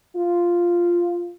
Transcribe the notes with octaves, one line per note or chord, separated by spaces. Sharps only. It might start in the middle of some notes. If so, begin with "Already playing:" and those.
F4